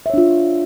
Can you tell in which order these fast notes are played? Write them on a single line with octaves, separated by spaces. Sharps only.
E5 C#5 D4 F4